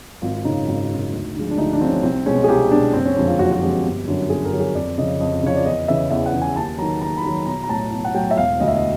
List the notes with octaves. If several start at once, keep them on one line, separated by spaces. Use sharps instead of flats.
G#1 F4
F#2 C#3 D#4
G#1
F#2 C#3
D2
D3 F3 G#3
D4
D2 D#4
D4
D3 F3 G#3 C4
C#4
C2 C4
B2 G#3 C#4
G#4
C2 G4
B2 G#3 D4
F#1 C4
C#4
F2 D3 F3 G#3
F4
F#1 F#4
F#4
F2 D3 F3 G#3 G4
G1
F#2 D3 F#3
G1 G#4
A#4
F#2 D3 F#3
G#4
F2 D5
C#3 F3 D#5
F2 D#5
C#3 F3 C#5
D5
E2 D#5
C#3 E3 E5
E2 E5
F#5
C#3 E3
G#5
D#2 A5
D#3 F#3 A#5
D#2 A#5
B5
D#3 F#3 A#5
B1 A#5
A#5
A2 F#3 A5
B1
F#5
A2 F#3 G5
E5
E1 F5
D2 D3 D#5
E5
D#5